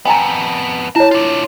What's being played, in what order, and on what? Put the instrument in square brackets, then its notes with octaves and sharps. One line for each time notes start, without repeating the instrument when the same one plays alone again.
[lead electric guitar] F2 B3 [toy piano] G5 G#5 A#5
[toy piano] E4 C#5 [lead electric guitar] A5
[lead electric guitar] D4 F4